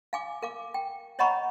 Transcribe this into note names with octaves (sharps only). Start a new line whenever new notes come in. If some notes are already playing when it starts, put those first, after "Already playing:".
F5 G#5 D6
A#4 F5 D6
G5
C#5 D#5 F#5 A#5 B5 C#6